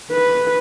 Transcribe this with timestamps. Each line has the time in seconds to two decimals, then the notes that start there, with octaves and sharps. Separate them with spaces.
0.12 B4